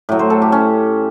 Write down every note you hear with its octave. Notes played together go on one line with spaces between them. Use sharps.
A2 F#3
C5
A4
G4
C#4